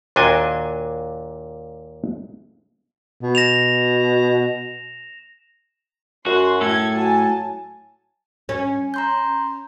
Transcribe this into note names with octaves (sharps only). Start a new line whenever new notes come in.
D#2 A#2 D4 F#4 D#5 G#5
B2
A#6 E7 F7
F#2 F#4 C6
A2 A4 G#6
F#3 G#5 A5
C#4
A#5 C6 G6